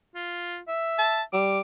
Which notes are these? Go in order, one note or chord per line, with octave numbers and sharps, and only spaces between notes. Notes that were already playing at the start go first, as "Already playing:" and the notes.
F4
E5
A5
G3 D6